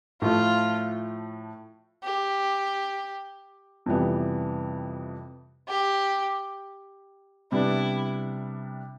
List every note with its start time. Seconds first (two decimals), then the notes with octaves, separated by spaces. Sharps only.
0.21 A2 F3 A3 F4
2.04 G4
3.86 F2 C3 E3 G3 B3
5.69 G4
7.52 C3 G3 B3 D4 E4